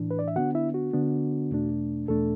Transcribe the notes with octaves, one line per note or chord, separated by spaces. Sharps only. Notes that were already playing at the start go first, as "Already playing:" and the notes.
Already playing: A2 E3 D4
B4
D5
E5
D3 B3 D4 F#4 F#5
E4 E5
F#4
D3 B3 D4
E2 B2 A3 D4
E2 B2 A3 D4 A4